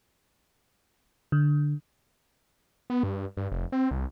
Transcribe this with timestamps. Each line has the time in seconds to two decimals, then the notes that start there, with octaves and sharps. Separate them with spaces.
1.32 D3
2.90 B3
3.03 G2
3.37 G2
3.51 F1
3.72 C4
3.91 C2